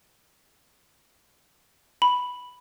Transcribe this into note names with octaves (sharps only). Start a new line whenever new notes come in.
B5